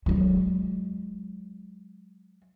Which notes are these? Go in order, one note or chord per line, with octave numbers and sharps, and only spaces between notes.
F#3 G#3